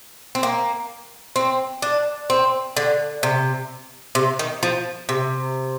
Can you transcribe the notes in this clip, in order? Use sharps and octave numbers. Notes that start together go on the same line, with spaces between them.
C4
A#3
C4
D4
C4
D3
C3
C3
D#3
F3
C3